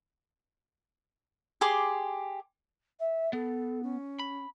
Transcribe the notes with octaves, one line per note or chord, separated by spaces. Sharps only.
G4 G#4 C6 D6
E5
B3 A4
C#4
B5